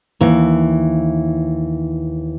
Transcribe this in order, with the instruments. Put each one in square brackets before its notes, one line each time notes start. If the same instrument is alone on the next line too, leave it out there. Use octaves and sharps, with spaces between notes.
[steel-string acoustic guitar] D#2 E3